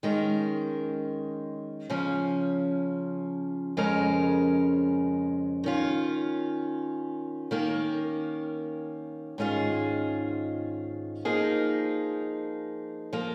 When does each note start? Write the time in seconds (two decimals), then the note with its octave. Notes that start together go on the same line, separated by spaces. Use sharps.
0.03 D#3 G#3 C#4 A#4
1.90 C#3 F3 C#4
3.77 F2 C#3 G#3 C#4 A#4
5.64 D#3 C#4 F4
7.51 D#3 A#3 C#4 A#4
9.38 G#2 D#3 C#4 F4 G#4
11.25 F3 A#3 D#4 G#4
13.13 F3 A#3